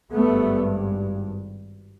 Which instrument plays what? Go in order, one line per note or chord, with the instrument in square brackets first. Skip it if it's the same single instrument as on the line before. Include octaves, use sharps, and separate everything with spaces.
[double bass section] G#1 G2 A3 B3